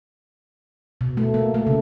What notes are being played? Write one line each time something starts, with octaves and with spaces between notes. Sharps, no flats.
B2
A3
A#3
A3
C#3